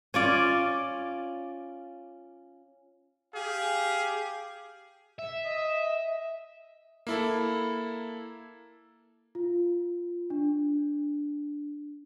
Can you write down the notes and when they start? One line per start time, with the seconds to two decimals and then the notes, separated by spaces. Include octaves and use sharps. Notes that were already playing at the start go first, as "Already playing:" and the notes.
0.14 C#4 F4 D5
3.34 G4 G#4 F5
5.19 E5
5.45 D#5
7.07 A#3 E4 A4
9.35 F4
10.30 D4